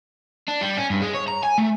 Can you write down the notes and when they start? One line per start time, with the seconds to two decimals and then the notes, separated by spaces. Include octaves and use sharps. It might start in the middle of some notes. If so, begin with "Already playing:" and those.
0.48 D4
0.61 G3
0.77 C#4
0.90 G2
1.02 G#3
1.15 C#5
1.28 A#5
1.43 G#5
1.58 A3